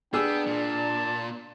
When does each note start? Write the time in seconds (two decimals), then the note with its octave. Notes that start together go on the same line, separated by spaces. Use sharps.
0.14 B3 D4 G#4 G5 E6
0.47 A#2 A5